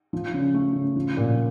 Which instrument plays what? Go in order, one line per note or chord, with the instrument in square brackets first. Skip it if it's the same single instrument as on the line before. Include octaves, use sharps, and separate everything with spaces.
[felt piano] F3
C#3
A3
C#3
F3
A#2